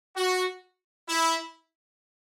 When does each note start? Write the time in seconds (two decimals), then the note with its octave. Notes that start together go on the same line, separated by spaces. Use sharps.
0.16 F#4
1.09 E4